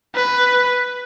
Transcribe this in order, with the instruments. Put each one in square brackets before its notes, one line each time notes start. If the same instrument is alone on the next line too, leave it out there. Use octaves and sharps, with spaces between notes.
[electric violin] B4